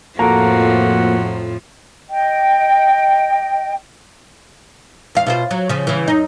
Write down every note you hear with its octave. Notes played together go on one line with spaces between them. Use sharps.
F2 A2 F3 A#3 F#4 A4 A#5
D#5 G5
E2 F5
B2 F4 C5
F#3
C#3 F3
C#3 E3
F#2 D#4